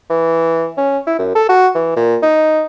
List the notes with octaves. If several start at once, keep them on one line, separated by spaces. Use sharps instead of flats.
E3
C#4
E4
F#2
A4
F#4
E3
A#2
D#4